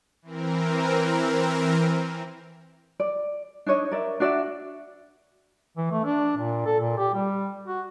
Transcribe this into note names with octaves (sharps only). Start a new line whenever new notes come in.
E3 C4 A#4
D5
D4 D#4 C#5 D#5
A#4 D5 E5
D4 F#4 D5 E5
E3
A3
D4
A#2
A4
A#2
G4
G3
F#4